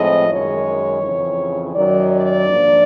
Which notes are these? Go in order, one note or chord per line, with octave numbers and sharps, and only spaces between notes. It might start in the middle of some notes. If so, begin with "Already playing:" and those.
Already playing: A2 F3 G#3 C4 D#5
F#2 D#3 G#3 C#5
F2 C#3 E3
F#2 D#3 F#3 D5
D5
G#2 F3 A#3 D4